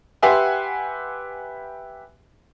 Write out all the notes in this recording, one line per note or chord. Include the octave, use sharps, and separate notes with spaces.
G4 B4 E5 F#5 G#5 C6